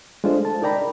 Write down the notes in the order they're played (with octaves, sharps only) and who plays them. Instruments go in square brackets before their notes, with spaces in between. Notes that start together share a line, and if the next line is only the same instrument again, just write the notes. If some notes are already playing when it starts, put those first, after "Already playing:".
[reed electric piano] G#3 D4 F4 A4 C5
A5
D#4 A#4 D5 G5 A#5 B5